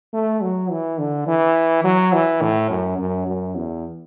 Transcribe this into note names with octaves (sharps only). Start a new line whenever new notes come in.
A3
F#3
E3
D3
E3
F#3
E3
A2
F#2
F#2
F#2
E2